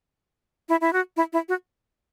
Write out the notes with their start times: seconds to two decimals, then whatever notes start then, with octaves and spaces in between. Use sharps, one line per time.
0.69 E4
0.81 E4
0.93 F#4
1.17 E4
1.33 E4
1.49 F#4